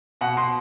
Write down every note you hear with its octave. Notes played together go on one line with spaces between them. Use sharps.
B2 F#5
B2 C6